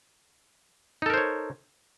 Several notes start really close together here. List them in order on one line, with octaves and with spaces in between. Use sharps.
D#4 A4 A#4 C5 C#5